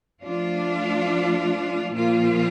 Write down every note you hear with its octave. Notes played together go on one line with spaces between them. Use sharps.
F3 A3 D4 F4
A#2 F3 A#3 F4